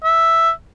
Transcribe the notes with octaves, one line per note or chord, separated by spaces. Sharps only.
E5